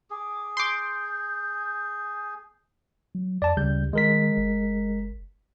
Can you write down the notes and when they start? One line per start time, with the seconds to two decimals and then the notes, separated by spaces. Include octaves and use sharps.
0.10 G#4 D6
0.57 C6 D6 G6
3.15 F#3
3.42 F2 D5 A5
3.57 D2 C#3 G3 G6
3.93 D#3 G#3 A#4 B6
4.37 F#1